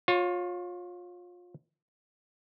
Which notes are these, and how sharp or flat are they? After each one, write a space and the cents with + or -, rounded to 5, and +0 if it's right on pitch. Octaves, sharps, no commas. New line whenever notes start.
F4 +25 C#5 -10